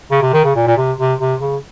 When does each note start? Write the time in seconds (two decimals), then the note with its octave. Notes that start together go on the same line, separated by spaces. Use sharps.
0.11 C#3
0.22 C3
0.33 D#3
0.44 C#3
0.55 A#2
0.67 A#2
0.77 C3
0.99 C3
1.19 C3
1.41 C#3